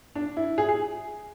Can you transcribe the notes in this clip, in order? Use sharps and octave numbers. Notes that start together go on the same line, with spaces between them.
D4
E4
G#4
G#4